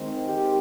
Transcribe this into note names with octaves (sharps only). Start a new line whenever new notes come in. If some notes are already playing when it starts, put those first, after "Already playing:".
Already playing: D#3 G#3 C4
G4